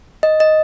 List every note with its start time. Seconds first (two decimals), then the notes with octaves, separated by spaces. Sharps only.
0.23 D#5
0.40 D#5